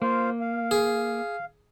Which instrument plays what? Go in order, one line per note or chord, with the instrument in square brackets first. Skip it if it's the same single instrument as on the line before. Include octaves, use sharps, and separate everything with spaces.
[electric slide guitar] A#3 [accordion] F4 C5 F5
[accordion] F5
[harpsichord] G#4